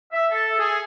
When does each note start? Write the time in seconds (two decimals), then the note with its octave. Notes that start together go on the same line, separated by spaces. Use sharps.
0.12 E5
0.31 A4
0.59 G#4